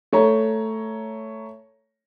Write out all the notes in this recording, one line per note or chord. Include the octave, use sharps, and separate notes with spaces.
A3 C#5 A#5